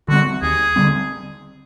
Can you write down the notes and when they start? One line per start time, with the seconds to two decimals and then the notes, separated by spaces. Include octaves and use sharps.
0.08 D3 G3 C4 F#4
0.42 D#2 G#4
0.76 D3 G3 C4